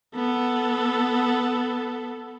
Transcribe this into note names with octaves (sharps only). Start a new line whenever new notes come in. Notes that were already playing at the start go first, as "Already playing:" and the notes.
B3 A4